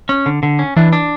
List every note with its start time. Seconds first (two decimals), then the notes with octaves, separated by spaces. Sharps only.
0.09 C#4
0.26 D3
0.43 D3
0.59 C#4
0.77 E3 D4
0.93 D4